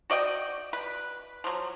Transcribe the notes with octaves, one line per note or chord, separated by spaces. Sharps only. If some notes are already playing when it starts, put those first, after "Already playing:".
F#4 D5 D#5 G5
B4
F3 F#3